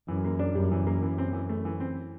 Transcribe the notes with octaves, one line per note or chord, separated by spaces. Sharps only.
F#2 E3
A#3
D4
F#2 G3
E3
A#3
F#2 E3
C4
E3
A3
E3
C4